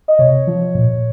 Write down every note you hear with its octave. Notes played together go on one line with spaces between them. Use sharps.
D#5
C3 C#5
F3
A#2